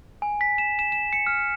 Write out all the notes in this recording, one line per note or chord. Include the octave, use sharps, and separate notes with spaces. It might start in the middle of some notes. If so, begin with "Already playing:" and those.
G#5
B6
E7
E7
E7
C#7
F6